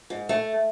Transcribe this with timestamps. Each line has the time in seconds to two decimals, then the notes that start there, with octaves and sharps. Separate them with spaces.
0.10 G#2
0.29 A3